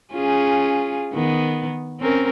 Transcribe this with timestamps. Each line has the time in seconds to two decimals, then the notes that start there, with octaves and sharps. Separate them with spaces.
0.13 C#4 F4 G#4
1.13 D#3 B3
2.00 C4 C#4 A#4